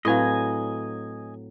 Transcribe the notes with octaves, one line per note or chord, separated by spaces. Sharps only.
A2 F#3 C4 B4 D#5 F5 G#5